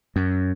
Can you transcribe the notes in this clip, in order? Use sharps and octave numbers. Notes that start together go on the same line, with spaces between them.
F#2